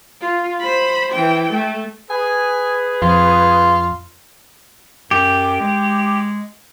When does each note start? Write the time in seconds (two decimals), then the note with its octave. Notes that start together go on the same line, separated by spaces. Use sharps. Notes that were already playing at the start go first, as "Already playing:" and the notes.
0.21 F4
0.60 C5 B5
1.13 E3 G5
1.53 A3
2.10 G#4 B4 G#5
3.02 F2 F4
5.11 F#2 G4
5.60 G#3